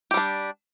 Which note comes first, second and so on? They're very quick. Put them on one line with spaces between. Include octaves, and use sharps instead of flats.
G4 G3 D4